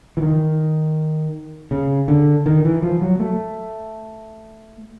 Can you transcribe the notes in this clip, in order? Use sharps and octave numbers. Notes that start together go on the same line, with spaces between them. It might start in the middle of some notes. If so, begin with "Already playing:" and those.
E3
D#3
C#3
D3
D#3
E3
F3
F#3
A3